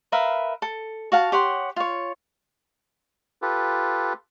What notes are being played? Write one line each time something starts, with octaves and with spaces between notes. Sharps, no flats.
A#4 B4 E5 F5
A4
F#4 F5 A5
G4 C#5 F#5 C6
F4 C#5
F4 G4 A4 B4